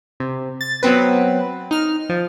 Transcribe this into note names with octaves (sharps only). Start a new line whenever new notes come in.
C3
A6
F#3 B3 C4 B4
D#4 F6
F3